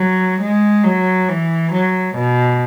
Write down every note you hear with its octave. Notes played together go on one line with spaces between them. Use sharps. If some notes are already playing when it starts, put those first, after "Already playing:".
Already playing: F#3
G#3
F#3
E3
F#3
B2